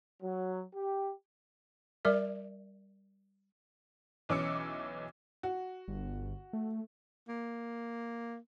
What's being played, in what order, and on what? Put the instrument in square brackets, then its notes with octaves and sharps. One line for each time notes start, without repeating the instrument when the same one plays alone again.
[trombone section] F#3
G4
[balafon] G3 A#4 D5 E5
[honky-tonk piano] B1 E3 C#4 D6 E6 C#7
[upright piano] F#4
[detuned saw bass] G1
A3
[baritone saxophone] A#3